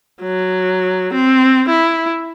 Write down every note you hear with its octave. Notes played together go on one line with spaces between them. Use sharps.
F#3
C4
E4